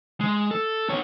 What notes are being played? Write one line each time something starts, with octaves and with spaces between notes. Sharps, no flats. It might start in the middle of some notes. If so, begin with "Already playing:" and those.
G#3
A4
B3 C#5